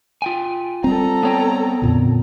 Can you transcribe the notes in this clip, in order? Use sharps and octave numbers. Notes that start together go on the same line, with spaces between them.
F4 G5 G#5
G3 C4 A4 A#5
B3 C#5 G5
F2 A#2 D3